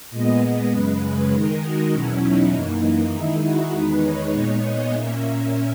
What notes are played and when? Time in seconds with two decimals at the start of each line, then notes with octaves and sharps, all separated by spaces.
0.11 A#2 G#3 B3 D#5
0.71 F#2 C#3 G#3 B4
1.01 B4
1.32 D#3 G#3 D#4 A#4
1.62 F#4
1.92 E2 B2 F#3 C#4 E4
2.23 D#4
2.52 F#2 E3 A#3
3.13 D#3 G#3 D#4 E4
3.43 F#4
3.73 E2 D#3 G#3 D#4 B4
4.04 C#5
4.33 A#2 G#3 B3 D#4 C#5
4.64 D#5
4.94 A#2 A#3 C#4 E5